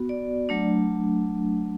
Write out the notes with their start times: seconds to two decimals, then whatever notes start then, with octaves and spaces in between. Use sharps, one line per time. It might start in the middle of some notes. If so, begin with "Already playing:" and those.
Already playing: B3 F#4
0.09 D5
0.49 F#3 A3 D4